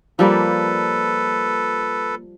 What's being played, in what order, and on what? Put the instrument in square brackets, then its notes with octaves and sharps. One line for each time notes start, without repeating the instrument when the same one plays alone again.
[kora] F3 G3 A#3 [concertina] A4 B4